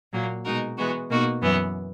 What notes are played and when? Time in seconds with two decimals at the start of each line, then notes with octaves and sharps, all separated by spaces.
0.12 A#2 F#3 A#3
0.44 B2 G#3 D#4 F#4 A#4
0.77 E3 G#3 B3 F#4
1.10 B2 A#3 D#4 F#4
1.42 F#2 E3 B3